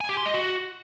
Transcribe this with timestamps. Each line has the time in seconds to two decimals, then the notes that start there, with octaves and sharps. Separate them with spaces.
0.01 G#5
0.09 G4
0.17 C6
0.26 D#5
0.34 F#4